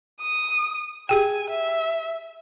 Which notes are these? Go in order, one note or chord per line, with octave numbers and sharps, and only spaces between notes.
D#6
G4 G#4 G5 G#5
E5